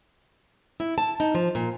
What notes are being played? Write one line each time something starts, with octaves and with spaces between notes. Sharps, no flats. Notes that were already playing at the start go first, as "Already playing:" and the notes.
E4
A5
D#4
F3
A#2